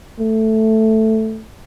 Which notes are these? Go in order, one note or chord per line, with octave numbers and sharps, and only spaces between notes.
A3